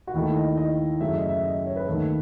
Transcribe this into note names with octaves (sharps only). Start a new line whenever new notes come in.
F#4
D#2 D#3 A3 E4
D#5
D#5
F#2 C#3 F#3 A3 E5
D#5
E5
D#5
C#5
B4
D#2 D#3 A3